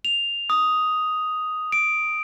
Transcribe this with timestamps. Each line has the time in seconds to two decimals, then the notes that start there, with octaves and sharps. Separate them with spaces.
0.05 F7
0.50 D#6
1.72 D7